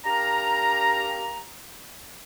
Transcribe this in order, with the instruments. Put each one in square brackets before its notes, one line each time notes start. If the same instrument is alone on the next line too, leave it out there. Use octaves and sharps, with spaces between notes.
[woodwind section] D4 G4 A#4 F5 A#5